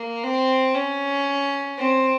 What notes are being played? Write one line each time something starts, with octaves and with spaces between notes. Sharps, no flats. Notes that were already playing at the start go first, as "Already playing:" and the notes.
Already playing: A#3
C4
C#4
C4